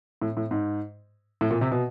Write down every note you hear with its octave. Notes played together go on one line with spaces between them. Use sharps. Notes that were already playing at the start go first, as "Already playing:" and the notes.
A2
A2
G#2
A2
A#2
C3
B2